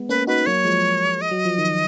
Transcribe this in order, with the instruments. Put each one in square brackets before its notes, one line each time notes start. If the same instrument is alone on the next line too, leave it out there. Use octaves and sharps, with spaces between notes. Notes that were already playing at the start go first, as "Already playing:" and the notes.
Already playing: [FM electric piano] G#3 B3
[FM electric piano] A#3 C#4 [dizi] B4
[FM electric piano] D#4 F#4 [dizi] B4
[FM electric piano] F#3 A#3 [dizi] C#5
[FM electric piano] F3 G#3
[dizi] D#5
[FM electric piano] F#3
F3
D#3